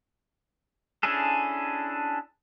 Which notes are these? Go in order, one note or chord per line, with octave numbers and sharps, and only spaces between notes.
C#4 D4 E4 G#4 A4